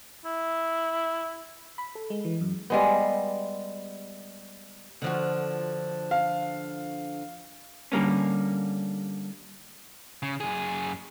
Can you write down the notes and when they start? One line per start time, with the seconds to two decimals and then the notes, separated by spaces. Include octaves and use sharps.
0.25 E4
1.78 B5
1.95 A4
2.10 G#3
2.25 E3
2.41 F#2
2.70 G3 G#3 B3
5.02 D3 F3 F#4
6.11 F5
7.92 D3 G3 A#3 C#4
10.22 C#3
10.40 F#2 G#4